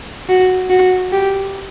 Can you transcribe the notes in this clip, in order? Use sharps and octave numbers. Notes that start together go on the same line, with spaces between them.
F#4
F#4
G4